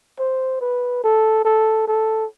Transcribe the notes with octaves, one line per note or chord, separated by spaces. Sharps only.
C5
B4
A4
A4
A4